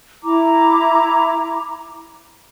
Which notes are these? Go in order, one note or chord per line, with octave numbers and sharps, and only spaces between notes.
E4 A#5 D6